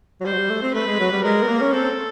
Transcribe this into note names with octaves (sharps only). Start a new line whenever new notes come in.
F#3
G3 C5
F#3
G3
A3
C4
A3 B4
G#3
F#3
G3
G#3 A#4
B3
A#3
C#4
C4 A4